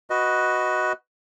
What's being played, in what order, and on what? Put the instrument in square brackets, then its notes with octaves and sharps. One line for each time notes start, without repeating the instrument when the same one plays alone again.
[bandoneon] F#4 B4 D#5